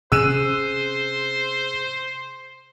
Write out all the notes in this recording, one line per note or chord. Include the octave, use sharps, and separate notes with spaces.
C3 C#4 G#4 C5 E6 F#6 D#7 E7